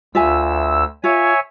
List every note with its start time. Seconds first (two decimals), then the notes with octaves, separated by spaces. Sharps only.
0.15 D2 F4 E5 G#5 E6
1.04 F4 C#5 E5 G#5